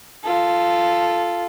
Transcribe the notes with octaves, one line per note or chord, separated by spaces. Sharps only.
F4 A4